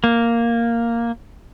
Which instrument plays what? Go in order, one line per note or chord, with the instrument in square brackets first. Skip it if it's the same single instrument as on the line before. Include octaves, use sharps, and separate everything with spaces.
[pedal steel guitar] A#3